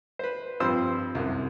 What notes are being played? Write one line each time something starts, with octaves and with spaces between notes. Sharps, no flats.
B4 C5
G2 F3 C4 C5 C6 E6
C2 F#2